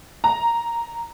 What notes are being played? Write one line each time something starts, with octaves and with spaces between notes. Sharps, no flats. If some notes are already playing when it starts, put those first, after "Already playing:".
A#5